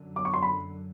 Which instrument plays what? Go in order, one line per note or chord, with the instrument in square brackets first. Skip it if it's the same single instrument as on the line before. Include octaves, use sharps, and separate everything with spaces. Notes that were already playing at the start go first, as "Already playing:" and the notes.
Already playing: [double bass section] F#2 D3 F#3
[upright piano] D6
C#6
C6
B5